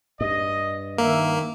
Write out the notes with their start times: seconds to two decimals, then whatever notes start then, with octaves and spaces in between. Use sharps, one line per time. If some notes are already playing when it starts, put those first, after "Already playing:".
0.21 G2 D#5
0.98 D#3 A#3 E5